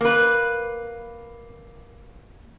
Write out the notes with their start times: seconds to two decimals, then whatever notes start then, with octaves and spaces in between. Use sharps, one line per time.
0.01 A#3 B4